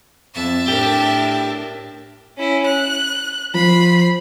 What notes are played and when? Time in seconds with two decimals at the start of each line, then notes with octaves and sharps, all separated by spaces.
0.34 F2 E5 A5
0.68 A2 D4 G4 A#4
2.38 C#4 E4
2.66 F#6
3.54 F3 B5 C7